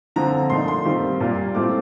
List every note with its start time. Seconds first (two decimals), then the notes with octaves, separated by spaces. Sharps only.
0.16 D3 F3 C4 A#5
0.50 A#2 A3 D#4 C6
0.68 C6
0.84 D#3 G3 C4 F4
1.20 A#2 G3 A#3 F4
1.54 A2 A3 C4 F4 D6